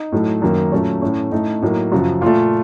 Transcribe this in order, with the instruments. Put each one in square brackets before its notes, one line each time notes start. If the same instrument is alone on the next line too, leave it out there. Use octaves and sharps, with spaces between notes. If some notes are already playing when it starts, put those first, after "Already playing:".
Already playing: [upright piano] D#4
A2 F#3 A3
F#2 D#3 F#3 A#3
A#2 F#3 A3 C#4
A2 A3 C#4
A2 A3 D#4
A2 F#3 A#3
F#2 C#3 F3 F#4
A#2 A3 F4